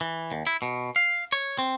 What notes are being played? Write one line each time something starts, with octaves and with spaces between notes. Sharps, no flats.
E3
D#2
E4
B2
F5
C#5
C4